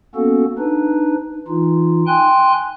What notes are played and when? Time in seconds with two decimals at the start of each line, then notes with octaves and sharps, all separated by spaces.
0.15 A#3 B3 C#4 F#4 A4
0.58 D4 D#4 B4
1.47 E3 D#4 F4
2.07 G5 G#5 C6 F#6